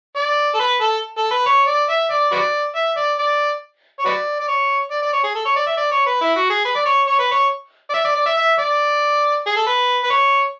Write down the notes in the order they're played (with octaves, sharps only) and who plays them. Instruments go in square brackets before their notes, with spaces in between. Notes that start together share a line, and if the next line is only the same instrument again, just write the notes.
[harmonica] D5
A4
B4
A4
A4
B4
C#5
D5
E5
D5
F#4 B4 D5
E5
D5
D5
C#5
F#4 B4 D5
D5
C#5
D5
D5
C#5
G#4
A4
C#5
D5
E5
D5
C#5
B4
E4
F#4
G#4
B4
D5
C#5
C#5
B4
C#5
D5
E5
D5
D5
E5
E5
D5
G#4
A4
B4
B4
C#5